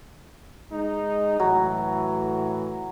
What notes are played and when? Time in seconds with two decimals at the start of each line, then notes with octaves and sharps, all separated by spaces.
0.70 G#3 D#4
1.40 A2 E3 F#3